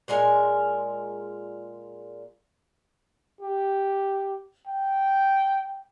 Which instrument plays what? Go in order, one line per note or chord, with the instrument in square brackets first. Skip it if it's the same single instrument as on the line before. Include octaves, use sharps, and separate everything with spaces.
[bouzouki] A#2 G#3 A#4 G#5
[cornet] G4
G5